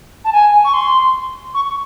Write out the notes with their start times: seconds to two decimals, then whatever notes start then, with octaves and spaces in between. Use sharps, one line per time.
0.25 A5
0.33 G#5
0.65 C#6
0.73 C6
1.54 C#6